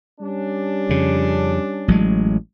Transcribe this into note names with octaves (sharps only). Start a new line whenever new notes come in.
G3 C#4 D4
F2 C#3
A1 F#3 G#3